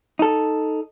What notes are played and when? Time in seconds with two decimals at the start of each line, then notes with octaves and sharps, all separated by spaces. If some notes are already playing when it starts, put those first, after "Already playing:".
0.19 D#4 A4